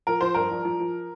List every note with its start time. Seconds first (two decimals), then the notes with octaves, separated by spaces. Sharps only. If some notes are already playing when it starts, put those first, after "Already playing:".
0.07 F3 A#4
0.21 F3 C5
0.34 G2 A#4
0.51 F3
0.65 F3
0.80 F3